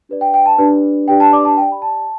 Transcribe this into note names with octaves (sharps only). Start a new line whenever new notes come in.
D4 G4 B4 D5
G5
G5
A5
D4 G4 B4 D5
D4 G4 B4 D5 G5
A5
D5 D6
A5
G4 D5 G5
B5
A5